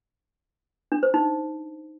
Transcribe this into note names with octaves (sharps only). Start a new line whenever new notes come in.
D4
C5
D#4